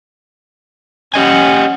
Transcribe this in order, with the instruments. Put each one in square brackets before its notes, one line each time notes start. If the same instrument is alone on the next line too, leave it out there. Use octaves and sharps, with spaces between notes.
[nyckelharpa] C#4 F#5 [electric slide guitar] G4 D#5 G#5